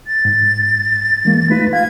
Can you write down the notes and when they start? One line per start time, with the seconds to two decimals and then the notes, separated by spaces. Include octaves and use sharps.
0.07 A6
0.25 G#2
1.25 E3 G#3 A#3
1.50 A3 D#4 F4 B4
1.73 F5 G#6